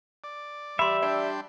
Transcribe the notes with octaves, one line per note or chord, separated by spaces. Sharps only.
D5
G3 E5 B5 C6
D4 D5 G5 C6